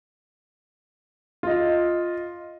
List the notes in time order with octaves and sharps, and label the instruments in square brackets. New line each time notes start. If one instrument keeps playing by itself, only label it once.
[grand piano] F4 D#5